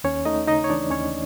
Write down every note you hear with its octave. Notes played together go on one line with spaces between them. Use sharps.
D#2 C#4 C#5
A3 D#4 D#5
C#3 D#4 D#5
C#5
E3 D4 D5
D#2 C#4 C#5